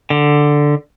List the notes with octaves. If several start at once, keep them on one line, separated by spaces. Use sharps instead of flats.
D3